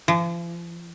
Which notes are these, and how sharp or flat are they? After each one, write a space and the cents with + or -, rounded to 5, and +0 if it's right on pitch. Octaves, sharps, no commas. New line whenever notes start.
F3 -40